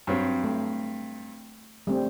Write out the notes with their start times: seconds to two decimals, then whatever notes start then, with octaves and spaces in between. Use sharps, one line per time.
0.07 G2 F#3 C4
0.44 A3
1.87 G3 A3 C4